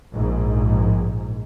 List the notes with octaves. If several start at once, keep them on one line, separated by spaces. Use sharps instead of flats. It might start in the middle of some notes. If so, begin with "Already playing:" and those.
A#1 G#2